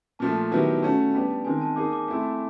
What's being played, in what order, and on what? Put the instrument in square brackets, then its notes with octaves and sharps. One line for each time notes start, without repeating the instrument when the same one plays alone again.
[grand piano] A#2 F3 A3 [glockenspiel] A5
[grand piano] D#3 F#3 B3 E4 G4
[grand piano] A3 C#4 F#4 [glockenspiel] A5
[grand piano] G3 B3 D4
[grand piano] D#3 G#3 C4 [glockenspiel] G#5
[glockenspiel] A5
[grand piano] A#3 D#4 G#4 [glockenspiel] D6
[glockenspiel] D6
[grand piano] A3 C4 E4